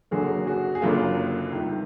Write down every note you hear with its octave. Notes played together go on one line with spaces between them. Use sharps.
F#1 F#2 D3 F#3 A#3 F#4 G#4
F#4 G#4
G#4
F#1 F#2 D3 F#3 A#3 F4 G4
C#2 C3 D#3 G3